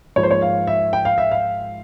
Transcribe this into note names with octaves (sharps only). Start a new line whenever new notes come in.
G#2 F3 A#3 C#5
C5
C#5
F5
E5
G5
F5
E5
F5